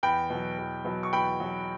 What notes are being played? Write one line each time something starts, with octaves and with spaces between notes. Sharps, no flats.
E2 G5 B5
B2 F#3
E2
B2 F#3
C#6
E2 G5 B5
B2 F#3